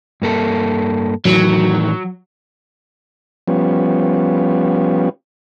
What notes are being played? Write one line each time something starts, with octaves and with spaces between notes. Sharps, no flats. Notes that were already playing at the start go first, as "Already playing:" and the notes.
G2 A#3 A4
A2 D#3 E3 F#3
F3 G3 B3 C#4